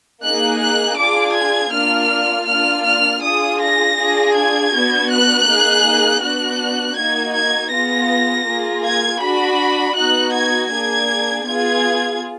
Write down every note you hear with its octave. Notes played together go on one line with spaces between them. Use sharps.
A#3 D#4 G#4 F#6
F#6
D4 F4 G#4 D6
G#6
A#3 D4 F4 F6
A#3 D4 F4 F6
F6
D4 F4 G#4 D#6
A#6
D4 F4 G#4
G#6
B3 D4 F#4
F#6
A#3 D#4 G#4
B3 D4 F#4 F#6
A#3 D#4 F#4 G#6
G#6
B3 F4 G#4 A#6
A#3 F4 G#4
G#6
D4 F#4 B5
B3 D#4 F#4 F#6
G#6
A#3 D4 G#4 G#6
B3 F4 G#4 G#6